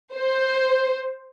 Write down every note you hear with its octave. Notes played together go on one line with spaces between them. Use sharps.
C5